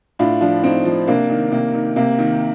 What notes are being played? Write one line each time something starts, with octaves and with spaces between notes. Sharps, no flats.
A2 D4 F4
F3 D4 F4
A2 C4 D#4
F3
C3 A#3 D4
D#3
C3 A#3
D#3
C3 A#3
D#3